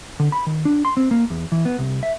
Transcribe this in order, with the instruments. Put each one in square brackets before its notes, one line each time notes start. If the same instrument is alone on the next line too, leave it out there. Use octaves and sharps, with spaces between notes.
[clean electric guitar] D3
B5
D#3
D4
C6
C4
A#3
E2
E3
B3
C2
E5